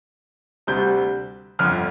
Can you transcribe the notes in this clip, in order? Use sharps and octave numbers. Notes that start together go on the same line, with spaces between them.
D2 C3 G3 G6
G1 F2 D3 F6